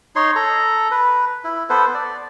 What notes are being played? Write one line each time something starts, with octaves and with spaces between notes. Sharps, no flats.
D#4 C#5 C6
A4 A#5
B4
E4
B3 A4 B4 C5
D5